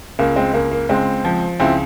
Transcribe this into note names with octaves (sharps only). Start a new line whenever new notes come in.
C#2 A#3
G#3 C4
C#2 A#3
A#3
C#2 G#3 C4
F3
C#2 C4 E4